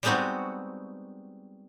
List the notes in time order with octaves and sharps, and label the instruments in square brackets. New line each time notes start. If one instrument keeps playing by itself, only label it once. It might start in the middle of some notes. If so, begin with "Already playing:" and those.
[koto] G3 G#3 B3 C4 D#4 F#4